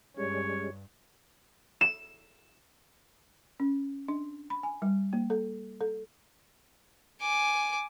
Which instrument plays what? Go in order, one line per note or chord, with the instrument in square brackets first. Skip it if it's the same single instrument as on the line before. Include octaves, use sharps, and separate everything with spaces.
[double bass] G2 [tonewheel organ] G3 G#3 C#4 [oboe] C#5
[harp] E7
[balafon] C#4
D4
B5
G#5
G3
A#3
A4
A4
[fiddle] G#5 D6